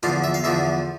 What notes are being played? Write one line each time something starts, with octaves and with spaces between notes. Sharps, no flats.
E2 D3 F3 F4
E5
F5
E2 D3 F3 E5